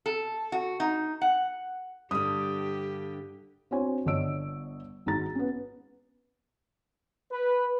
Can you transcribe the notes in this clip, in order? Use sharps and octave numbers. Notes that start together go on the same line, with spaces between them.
A4
F#4
D#4
F#5
G2 D3 G4 D#6
C4 D4 F#4 C5 C#5 G#5
G1 D3 C#5 D#5 E6 D7
G#1 D#4 F#4 G#4 A#5 A6
B3 C#4
B4